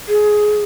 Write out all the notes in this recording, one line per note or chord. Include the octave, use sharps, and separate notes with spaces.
G#4